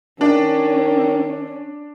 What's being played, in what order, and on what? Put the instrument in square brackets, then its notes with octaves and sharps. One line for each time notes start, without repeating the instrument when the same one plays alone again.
[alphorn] D#3 [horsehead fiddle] C#4 [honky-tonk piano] D4